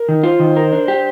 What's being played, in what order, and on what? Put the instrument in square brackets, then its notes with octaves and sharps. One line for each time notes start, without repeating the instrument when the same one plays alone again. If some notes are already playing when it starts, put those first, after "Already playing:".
Already playing: [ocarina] A#4
[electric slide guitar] D#3
[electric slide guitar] F4 [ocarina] C5
[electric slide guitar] D#3
A#4
D4
G4